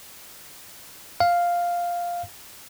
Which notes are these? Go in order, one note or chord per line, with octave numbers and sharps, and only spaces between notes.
F5